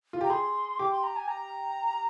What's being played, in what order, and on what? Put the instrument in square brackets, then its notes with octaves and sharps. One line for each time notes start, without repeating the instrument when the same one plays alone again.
[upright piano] F4
G4
[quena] A#5
[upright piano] G#4 [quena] C6
[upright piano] G4 [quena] D6
[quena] C6
A#5
G#5
A#5